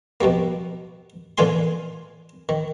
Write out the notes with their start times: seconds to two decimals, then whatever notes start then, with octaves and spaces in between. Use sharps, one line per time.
0.21 B2 F3 G3 A#3
1.38 A#2 D3 E3 F4 G#5 C6
2.49 D#3